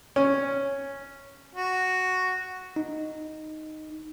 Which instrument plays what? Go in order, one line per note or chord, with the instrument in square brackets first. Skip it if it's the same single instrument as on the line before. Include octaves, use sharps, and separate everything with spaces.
[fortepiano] C#4
[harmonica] F#4
[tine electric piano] D#4